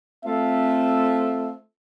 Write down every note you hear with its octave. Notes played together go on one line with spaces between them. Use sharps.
A3 C4 F4 A4 E5